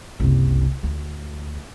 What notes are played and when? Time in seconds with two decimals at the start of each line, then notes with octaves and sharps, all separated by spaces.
0.20 F#1 C2
0.83 D2